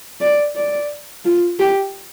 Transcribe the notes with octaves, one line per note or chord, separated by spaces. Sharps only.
D5
D5
F4
G4